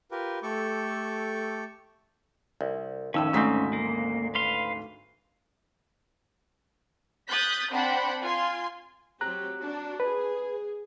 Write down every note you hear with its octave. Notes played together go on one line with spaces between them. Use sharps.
F4 G4 A#4 B4
A3 G4 A4 C#6 D6
C2
F2 A2 D#3 C#4 E6
G#1 D2 G#2 C#3 C4 B6
A#3
B4 F5 C6
D#6 F#6 G6 A6 B6
C4 D4 C5 F#5 G5 B5
F4 G#5 C6
F#3 C4 G4 A#5 F#6
D4 F#4
G#4 B4